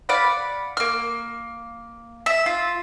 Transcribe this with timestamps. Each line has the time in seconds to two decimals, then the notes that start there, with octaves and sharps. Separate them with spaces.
0.09 D5 F5 F#5 B5
0.77 A#3 F6
2.26 E5
2.46 F4